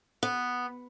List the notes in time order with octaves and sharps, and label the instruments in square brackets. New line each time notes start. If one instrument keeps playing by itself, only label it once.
[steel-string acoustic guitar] B3